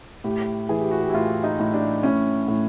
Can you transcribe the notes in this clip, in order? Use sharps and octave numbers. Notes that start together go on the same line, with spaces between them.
A2 G4
E3 G#4
G4
F#4
G4
E4
A2 F4
D#4
A2
D4
A2 C#4
A2